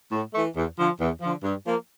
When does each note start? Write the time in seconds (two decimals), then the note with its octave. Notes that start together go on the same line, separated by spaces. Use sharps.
0.12 A2
0.33 E3 A3
0.55 E2
0.77 D3 F3
0.99 E2
1.21 D3 F3
1.43 G2
1.65 F3 A#3